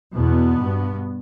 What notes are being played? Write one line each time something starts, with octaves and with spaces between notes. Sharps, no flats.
E2 B2 B3
G2